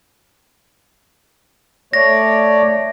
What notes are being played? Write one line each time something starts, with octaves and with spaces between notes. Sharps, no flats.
A3 C#5 D5 A#6